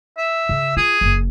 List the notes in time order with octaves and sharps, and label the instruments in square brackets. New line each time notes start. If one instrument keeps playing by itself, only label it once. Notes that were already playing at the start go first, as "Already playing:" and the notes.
[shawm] E5
[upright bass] C#3
[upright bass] F4 [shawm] G#4
[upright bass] F#1 F#2